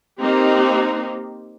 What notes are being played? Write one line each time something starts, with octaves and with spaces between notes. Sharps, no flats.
A#3 C4 D#4 G4